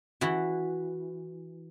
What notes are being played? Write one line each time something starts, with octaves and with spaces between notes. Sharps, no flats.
E3 F#4